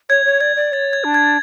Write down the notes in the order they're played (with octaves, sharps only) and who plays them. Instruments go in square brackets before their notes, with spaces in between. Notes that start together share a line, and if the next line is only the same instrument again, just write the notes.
[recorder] C#5 [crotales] G#6
[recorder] C#5
[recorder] D5 [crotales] G#6
[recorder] D5
[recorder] C#5 [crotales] A6
[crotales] G#6
[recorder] D4
[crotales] G#6